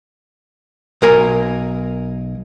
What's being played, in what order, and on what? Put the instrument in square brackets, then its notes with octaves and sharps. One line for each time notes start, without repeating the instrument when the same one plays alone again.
[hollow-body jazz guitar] B1 A#4 G#5